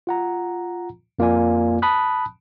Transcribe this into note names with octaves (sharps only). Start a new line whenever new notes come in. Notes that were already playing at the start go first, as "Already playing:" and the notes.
F4 F#5 A#5
F2 A#3 F4 D5 G#5
A5 B5 D#6 F#6